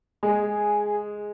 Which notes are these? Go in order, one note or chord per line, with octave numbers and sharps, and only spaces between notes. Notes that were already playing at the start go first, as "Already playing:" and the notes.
G#3 G#4